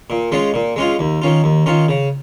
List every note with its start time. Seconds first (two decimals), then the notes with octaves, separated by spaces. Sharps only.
0.10 A#2
0.32 G#3 C#4 F4
0.54 A#2
0.76 G#3 C#4 F4
0.99 D#2
1.22 D#3 C#4 F4
1.44 D#2
1.66 D#3 C#4 F4
1.89 C#3